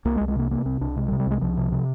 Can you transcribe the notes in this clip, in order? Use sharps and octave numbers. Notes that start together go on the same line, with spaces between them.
C2 A#3
G#3
C2
G#3
C3 A#3
C3 A#3
C2 C4
C2 D4
C3 G#3
G3
C3
G3
C2 G#3
C2 F3
C3
C3